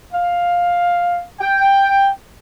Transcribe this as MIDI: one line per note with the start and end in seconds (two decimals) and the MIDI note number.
0.13 1.24 77
1.40 2.09 79